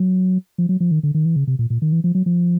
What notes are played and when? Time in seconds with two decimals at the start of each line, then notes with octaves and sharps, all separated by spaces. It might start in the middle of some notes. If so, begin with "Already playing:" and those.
Already playing: F#3
0.58 F3
0.69 F#3
0.80 F3
0.91 D#3
1.03 D3
1.14 D#3
1.25 E3
1.36 C#3
1.47 C3
1.59 A#2
1.70 A#2
1.82 D#3
1.92 E3
2.04 F3
2.15 F#3
2.26 F3